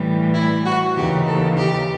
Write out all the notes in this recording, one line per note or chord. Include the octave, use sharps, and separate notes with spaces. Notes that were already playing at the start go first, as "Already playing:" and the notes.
Already playing: A2 E3 G3
E4
F#4
D#2 C#3 E3 G4
A4
G4